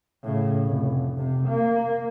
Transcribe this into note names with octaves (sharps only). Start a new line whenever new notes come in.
A2 C#3
F1
C3
A#3